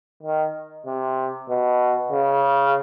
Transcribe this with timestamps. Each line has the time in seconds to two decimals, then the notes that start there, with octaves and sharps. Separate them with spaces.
0.23 D#3
0.86 C3
1.49 B2
2.11 C#3